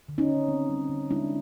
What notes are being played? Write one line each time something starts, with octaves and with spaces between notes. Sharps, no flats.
D3
C#4 D#4
D3
C4
G3
D3
G#3 D4 E4